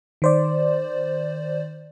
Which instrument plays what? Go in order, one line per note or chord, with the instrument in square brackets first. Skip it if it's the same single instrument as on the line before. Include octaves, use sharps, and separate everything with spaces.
[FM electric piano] D#3 C5 D5